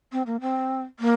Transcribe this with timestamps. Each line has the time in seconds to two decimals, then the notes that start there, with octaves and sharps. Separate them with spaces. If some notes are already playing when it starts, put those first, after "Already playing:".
0.12 C4
0.26 A#3
0.41 C4
1.00 A#3